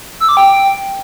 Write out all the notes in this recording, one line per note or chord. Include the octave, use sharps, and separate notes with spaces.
E6
D6
G5